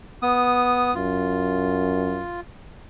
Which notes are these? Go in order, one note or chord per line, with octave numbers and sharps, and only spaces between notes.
B3 D#6
F#2 F4